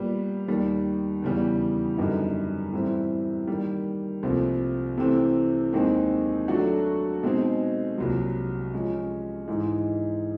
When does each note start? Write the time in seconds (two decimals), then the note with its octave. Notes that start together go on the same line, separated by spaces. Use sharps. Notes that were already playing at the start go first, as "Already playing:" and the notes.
Already playing: A#2 G3 B3
0.48 D#2 D#3 G3
1.22 E2 C#3 E3 G3
1.98 F#2 D3 G3 B3 D#4
2.72 A2 E3 G3 C4 E4
3.47 D#3 G3 A#3
4.22 C2 A#2 F3 A3 C4
4.97 C3 E3 A3 C4
5.72 D#2 D#3 G#3 C4
6.48 F#3 A3 D4 F#4 A4
7.23 B2 G#3 C4 D#4 G#4
7.98 C2 A#2 F#3
8.73 F3 G#3 C#4
9.48 G#2 E3 G#3